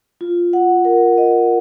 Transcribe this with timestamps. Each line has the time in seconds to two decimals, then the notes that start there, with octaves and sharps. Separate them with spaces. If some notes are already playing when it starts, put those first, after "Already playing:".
0.21 F4
0.53 F#5
0.85 A#4
1.18 D#5